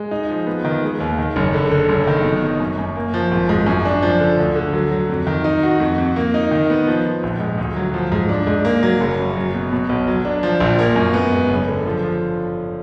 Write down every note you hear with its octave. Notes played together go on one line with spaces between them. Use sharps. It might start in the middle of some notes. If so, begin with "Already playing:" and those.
Already playing: G#3
D#4
F3
B3
D#3
G#3
D#2
D#3
F#1
D3
D3
F#1
D#3
B2
D#4
F#2
F#2
A#3
F3
G#1
G#2
F#2
D4
F3
D3
D2
D3
F#3
F#3
F2
D#3
D#4
F#4
F2
F2
A#3
D#4
D#3
B3
F3
F3
A#1
G#2
D2
F#3
F3
G#2
D4
G#2
A#3
F#3
F#1
F#2
F#3
B2
B2
B1
F#3
D4
F3
A#1
A#3
F#2
B3
G#2
F#1
D3
F3
F3